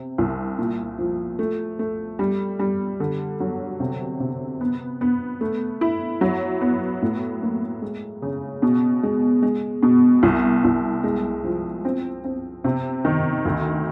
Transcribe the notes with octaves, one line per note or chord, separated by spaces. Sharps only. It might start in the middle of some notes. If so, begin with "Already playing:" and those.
Already playing: C3
C2
A#2
F3
A3
A3
G3
G3
D3
F#3
C3
C3
B3
B3
A3
E4
F#3
B3
A2
A#3
G#3
C#3
B2
G#3
G#3
B2
C2
C2
G#3
F3
C4
C4
C3
D#3
D2